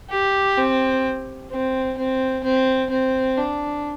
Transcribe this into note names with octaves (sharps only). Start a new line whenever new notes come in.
G4
C4
C4
C4
C4
C4
D4